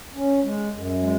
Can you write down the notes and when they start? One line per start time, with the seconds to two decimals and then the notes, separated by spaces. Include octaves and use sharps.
0.15 C#4
0.43 G#3
0.72 F#2
1.00 G#3